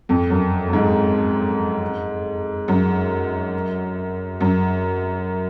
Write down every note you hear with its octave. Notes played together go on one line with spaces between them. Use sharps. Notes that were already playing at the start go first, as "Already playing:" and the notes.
F2
F#2
F#2
G#2
F#2
F#2